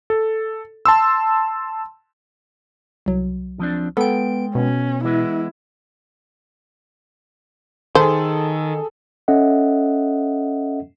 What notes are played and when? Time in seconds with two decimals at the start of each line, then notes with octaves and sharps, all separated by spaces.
0.10 A4
0.85 A5 C6 E6
3.06 C2 F#3
3.59 F3 C4 D4
3.97 G#3 B3 A4 G5 D7
4.55 B2 C#4
5.04 E3 G#3 B3 E4
7.95 D#3 G#4 A4 C5
9.28 C#4 A4 D#5 E5 F#5